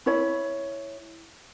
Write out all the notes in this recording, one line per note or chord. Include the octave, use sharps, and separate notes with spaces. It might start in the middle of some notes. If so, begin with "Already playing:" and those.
E4 C#5 B5